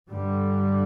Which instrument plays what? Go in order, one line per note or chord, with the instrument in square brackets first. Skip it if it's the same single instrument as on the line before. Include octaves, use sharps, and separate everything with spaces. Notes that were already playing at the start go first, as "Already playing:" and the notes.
[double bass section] G2 D3 G3